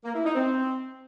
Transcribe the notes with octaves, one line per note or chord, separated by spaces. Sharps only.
A#3
E4
D#4
C4